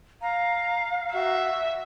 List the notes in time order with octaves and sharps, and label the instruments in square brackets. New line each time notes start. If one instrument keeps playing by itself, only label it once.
[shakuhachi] F5 [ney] A#5
[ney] F#4 [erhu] E5